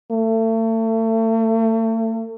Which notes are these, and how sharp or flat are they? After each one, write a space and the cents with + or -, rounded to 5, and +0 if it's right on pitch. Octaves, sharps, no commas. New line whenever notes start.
A3 +35